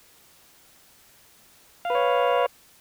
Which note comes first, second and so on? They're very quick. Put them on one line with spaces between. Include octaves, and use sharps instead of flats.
F5 B4 C#5